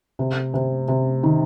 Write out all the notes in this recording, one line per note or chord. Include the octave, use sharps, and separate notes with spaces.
C3
C3
C3
D#3